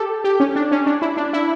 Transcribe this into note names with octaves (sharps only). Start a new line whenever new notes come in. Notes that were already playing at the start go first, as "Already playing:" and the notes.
Already playing: G4 A4
G4
C#4
D4
C#4
D4
E4
D4
E4